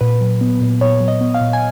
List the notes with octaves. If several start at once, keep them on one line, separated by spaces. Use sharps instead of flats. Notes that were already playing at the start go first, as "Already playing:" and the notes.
A#2 B4
F#3
B3
A#2
A#2 C#5
F#3
D#5
B3
F5
A#2
G#5